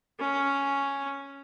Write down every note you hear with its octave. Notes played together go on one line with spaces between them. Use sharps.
C#4